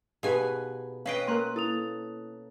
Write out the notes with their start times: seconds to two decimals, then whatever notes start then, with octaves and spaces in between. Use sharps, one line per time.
0.23 B2 D#4 G4 G#4 B4 F5 G#5
1.06 C#4 B4 D#5 F5 G5 C7 D7
1.27 A#3 A#4 A#5 C6 F#6
1.56 E4 A4 D#6 F7